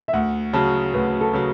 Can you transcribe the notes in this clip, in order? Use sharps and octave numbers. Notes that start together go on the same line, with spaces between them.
E5
D2 F#5
C#3 F#3 A5
D2 B4
A4
C#3 F#3